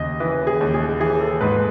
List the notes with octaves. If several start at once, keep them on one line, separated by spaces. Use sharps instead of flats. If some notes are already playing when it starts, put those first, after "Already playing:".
Already playing: D#2 C#3 D#5
E3 B4
G#4
D#2
G#4
E3 G#4
A4
G#2 B4